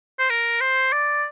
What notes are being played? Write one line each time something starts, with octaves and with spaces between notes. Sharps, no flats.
C5
A#4
C5
D5